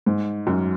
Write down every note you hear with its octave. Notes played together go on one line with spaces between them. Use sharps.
G#2
F#2